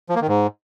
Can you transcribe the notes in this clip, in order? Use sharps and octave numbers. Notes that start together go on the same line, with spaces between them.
F3
A#3
D#3
G#2